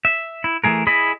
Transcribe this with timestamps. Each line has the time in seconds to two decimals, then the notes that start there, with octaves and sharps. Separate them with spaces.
0.05 E5
0.44 E4
0.64 E3 A3 G#4 A#4
0.87 E4 G#4 D#5 B5